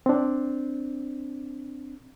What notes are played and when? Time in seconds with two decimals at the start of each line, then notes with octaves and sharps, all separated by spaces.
0.06 C4 D4